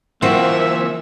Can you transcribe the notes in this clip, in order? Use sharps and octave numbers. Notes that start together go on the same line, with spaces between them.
E3 A#3 C4 F4 F#4 E5